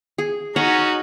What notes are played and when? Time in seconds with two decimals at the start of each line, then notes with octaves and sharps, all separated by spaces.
0.18 G#4
0.56 C#4 D#4 F#4 C#5 F#5 A#5